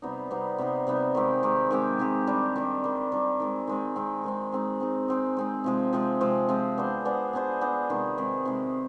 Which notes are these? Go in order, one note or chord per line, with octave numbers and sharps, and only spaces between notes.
C3 G3 B3 D#4
C3 G3 B3 D#4
C3 G3 B3 D#4
C3 G3 B3 D#4
D#3 G#3 C4 G4
D#3 G#3 C4 G4
D#3 G#3 C4 G4
D#3 G#3 C4 G4
D#3 G3 D4
D#3 G3 D4
D#3 G3 D4
D#3 G3 D4
D#3 G#3 C4
D#3 G#3 C4
D#3 G#3 C4
D#3 G#3 C4
G#3 C4 D#4
G#3 C4 D#4
G#3 C4 D#4
G#3 C4 D#4
C3 F3 G#3 C4
C3 F3 G#3 C4
C3 F3 G#3 C4
C3 F3 G#3 C4
B3 D4 G#4 C5
B3 D4 G#4 C5
B3 D4 G#4 C5
B3 D4 G#4 C5
C3 D#3 G#3
C3 D#3 G#3
C3 D#3 G#3